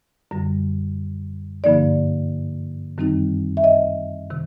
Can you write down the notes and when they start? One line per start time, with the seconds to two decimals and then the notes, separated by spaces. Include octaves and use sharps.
0.31 F#2 D3 G3
1.64 G2 D3 F3 A#3 D#4 D5
2.98 F#2 D#3 G3 C4 D#4
3.57 E5
3.64 D#5
4.31 C3 D#3